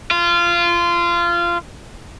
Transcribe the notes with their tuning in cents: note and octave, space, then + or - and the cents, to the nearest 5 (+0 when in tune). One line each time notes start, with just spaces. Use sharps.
F4 -20